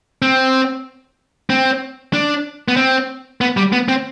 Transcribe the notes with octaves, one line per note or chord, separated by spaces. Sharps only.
C4
C4
D4
B3
C4
B3
G3
B3
C4